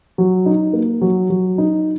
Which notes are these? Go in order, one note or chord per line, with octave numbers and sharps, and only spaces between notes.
F#3
D#4
A#3
F#3
F#3
D#4